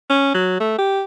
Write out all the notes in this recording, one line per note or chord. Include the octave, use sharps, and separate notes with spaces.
C#4
F#3
A3
G4